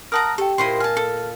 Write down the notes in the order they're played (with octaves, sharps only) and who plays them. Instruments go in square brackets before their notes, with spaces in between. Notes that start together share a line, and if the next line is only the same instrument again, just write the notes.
[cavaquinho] A#4 F#5 A#5 [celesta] A5 D#6 F6
[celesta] G4 G5 [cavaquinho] A4
[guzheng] A#2 D#5 [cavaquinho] E4 C5 C6
[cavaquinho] G#5 A5 [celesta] F6
[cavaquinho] A4